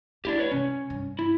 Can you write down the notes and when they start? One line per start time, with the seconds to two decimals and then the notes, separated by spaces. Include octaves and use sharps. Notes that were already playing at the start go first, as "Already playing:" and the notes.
0.25 A3 D4 E4 G4
0.39 B4 C#5
0.51 C3 G#3 C#4
0.90 G2
1.19 E4